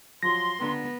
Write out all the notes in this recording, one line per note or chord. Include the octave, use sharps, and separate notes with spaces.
F3 F#3 C6 A#6
C#2 D3 B3